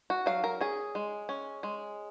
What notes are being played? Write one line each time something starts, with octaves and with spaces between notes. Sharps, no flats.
F#4
F#3 F5
A#4
C#4 G#4
G#3
C#4
G#3